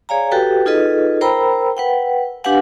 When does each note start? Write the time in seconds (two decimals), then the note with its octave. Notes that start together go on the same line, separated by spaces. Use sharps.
0.09 G#4 C#5 D5 F5 G#5 A#5
0.31 F#4 G4 A4 B4 G5
0.66 D#4 F4 G#4 A4 B4 D#5
1.21 A#4 C5 G5 A#5 B5 E6
1.77 B4 F#5 G5
2.44 D4 G4 B4 F5 F#5 G#5